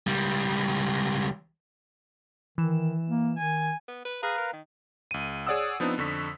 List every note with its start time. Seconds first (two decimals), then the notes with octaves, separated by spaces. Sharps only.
0.07 C#2 G3
2.58 D#3 E3 E7
3.10 A#3
3.38 D#3 G#5
3.88 B3
4.05 B4
4.23 G#4 B4 F5 A#5
4.38 A#4
4.53 D#3
5.11 C#2 D#7
5.47 G#4 C#5 D5 F#5 D#6 E6
5.80 F3 B3 C4 D4 D#4
5.98 F2 D3 C#6 B6